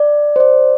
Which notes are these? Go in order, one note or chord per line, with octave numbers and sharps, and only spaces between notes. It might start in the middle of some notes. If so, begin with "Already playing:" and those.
Already playing: D5
C5
D5